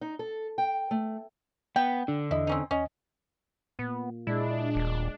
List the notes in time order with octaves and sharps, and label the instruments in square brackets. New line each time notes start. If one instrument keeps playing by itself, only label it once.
[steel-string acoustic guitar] D#4
A4
G5
A3
[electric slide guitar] B3 [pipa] G5
[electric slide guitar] D3 [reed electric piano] D4
[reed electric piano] E2 D#5 [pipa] E4
[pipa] C4 C#4 D#4
[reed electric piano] D#2 D#5 [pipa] C#4
[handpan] A#2 [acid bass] B3
[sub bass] A#2 [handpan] G#3 [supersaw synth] D4 [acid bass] E4
[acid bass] D#1